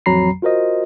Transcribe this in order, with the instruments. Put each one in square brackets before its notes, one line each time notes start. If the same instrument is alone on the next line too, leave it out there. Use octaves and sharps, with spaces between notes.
[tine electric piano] A1 F2 F#3 A#5 B5 C7
F4 F#4 A#4 C5 D#5